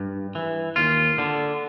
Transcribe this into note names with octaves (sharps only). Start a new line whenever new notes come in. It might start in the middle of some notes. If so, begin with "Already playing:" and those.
Already playing: G2
E3
D#2 F4
D3